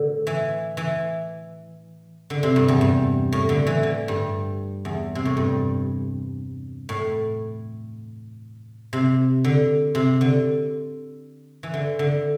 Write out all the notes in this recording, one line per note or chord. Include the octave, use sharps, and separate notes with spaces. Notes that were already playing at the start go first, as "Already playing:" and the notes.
Already playing: A2 D3
E3
E3
D3
C3
G2
E2
G2
A2
D3
E3
D3
G2
E2
C3
A2
G2
A2
C3
D3
C3
D3
E3
D3
D3